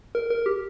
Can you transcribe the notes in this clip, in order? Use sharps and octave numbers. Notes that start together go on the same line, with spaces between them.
A#4
A#4
G4